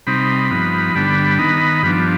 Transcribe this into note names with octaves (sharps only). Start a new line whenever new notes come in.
C3 G3 C4 D#4 B5
G2 F3 B3 D#4
G2 D3 G3 B3 D4
D#3 B3 D#4
G2 F3 B3 D4